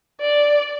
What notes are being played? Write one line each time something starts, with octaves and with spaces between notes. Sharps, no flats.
D5